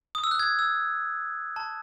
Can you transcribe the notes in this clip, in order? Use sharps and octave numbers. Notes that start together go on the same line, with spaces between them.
D#6
E6
F#6
G#6
E6
A5